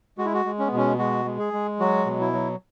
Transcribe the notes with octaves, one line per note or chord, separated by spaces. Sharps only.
G#3 F#4
E4
F#4
G#3
C#4
B3
B2
C#4
G#3 F#4
G#3
G#4
G#3
F#3 F#4
B2
E4
F#3